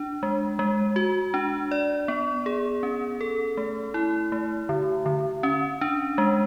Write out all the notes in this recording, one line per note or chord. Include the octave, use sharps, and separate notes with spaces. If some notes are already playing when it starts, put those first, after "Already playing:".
Already playing: D4
G#3
G#3
F#4
D4
D5
B3
G#4
C#4
A4
A3
E4
A3
D3
D3
C#4
D4
G#3